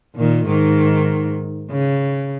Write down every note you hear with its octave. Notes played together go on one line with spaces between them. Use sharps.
A#2 D#3
G#2 D#3
C#3